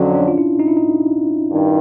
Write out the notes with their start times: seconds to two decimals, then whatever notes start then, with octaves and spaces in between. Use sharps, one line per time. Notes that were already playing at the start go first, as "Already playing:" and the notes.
Already playing: F2 D3 F#3 C#4 D4
0.15 D4
0.28 F4
0.38 E4
0.59 D#4
0.68 E4
0.77 D#4
1.49 G2 D#3